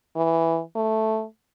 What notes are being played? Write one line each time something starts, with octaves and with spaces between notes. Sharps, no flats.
E3
A3